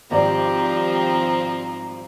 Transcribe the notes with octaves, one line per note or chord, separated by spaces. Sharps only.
G#1 F3 G3 C4 G4 D5 A#5